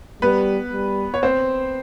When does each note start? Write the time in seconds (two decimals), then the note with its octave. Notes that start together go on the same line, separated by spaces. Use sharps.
0.22 G3 B3 B4
0.72 G3
1.14 C#5
1.23 C4 C5